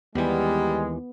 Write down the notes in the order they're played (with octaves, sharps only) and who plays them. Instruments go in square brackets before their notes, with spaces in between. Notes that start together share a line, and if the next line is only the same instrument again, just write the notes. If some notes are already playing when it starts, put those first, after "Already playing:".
[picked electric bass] D#2 E3 [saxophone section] G3 [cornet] G#3 [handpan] B3